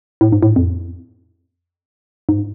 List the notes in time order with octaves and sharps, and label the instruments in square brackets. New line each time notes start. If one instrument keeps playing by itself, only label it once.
[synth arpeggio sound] A2
G#2
A2
F2
G#2